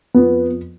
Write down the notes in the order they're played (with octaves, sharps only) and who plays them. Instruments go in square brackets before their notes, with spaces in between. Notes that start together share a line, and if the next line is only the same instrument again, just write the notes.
[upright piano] F2 F3 B3